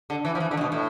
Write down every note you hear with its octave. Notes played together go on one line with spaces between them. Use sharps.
D3
E3
F3
E3
D3
A2
B2
A2